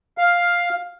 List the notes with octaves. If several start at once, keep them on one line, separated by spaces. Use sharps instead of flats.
F5